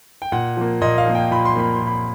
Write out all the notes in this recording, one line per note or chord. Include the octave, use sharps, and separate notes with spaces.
G5
A#2 F#5
F3 A#3
A#2 D#5
F5
F3 A#3
G5
A#2 B5
C6
F3 A#3 B5
C6
A#2
B5